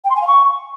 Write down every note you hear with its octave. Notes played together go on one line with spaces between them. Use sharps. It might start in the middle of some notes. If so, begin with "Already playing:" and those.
G5
C6
G#5
F5
C#6